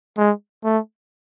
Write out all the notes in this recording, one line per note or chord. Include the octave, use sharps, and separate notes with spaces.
G#3
A3